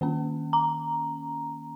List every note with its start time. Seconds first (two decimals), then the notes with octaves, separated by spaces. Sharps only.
0.01 D#3 A#3 C#4
0.53 A#5